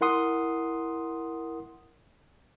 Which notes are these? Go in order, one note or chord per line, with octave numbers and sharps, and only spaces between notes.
E4 A#4 F#5 C6 D#6